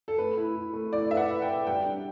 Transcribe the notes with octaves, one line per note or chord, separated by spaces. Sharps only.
A4
A3 B4
E4
E4
A3
E4 D5
B4 E5
F#5
B4
G5
B4
G3 G5
D4